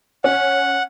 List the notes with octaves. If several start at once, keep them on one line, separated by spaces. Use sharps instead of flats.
C#4 F#5